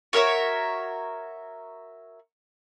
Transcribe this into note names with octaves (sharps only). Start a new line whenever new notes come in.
F#4 A#4 C#5 E5